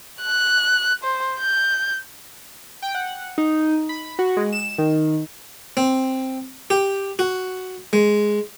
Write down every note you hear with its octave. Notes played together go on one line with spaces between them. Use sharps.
F#6
C5
G6
G5
F#5
D#4
B5
F#4
G#3
E7
D#3
C4
G4
F#4
G#3